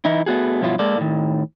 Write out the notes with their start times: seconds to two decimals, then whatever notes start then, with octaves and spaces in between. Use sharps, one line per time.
0.05 E3 D#4 E4
0.26 A3 B3 F#4 G#4
0.61 G2 B2 F3 F#3 E4 F4
0.79 G#3 A#3 A4 D5
0.97 A2 D#3